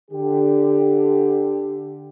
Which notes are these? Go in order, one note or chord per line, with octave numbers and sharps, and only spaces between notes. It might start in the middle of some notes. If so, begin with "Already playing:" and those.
D3 G4